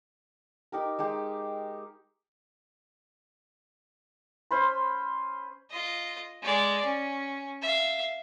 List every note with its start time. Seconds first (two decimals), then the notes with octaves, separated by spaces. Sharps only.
0.72 D#4 G4 A#4
0.99 G#3 D#4 G4 D#5
4.51 C#4 C5 B5 C6
5.71 F4 D#5
6.43 G#3 D5
6.85 C#4
7.62 E5 F5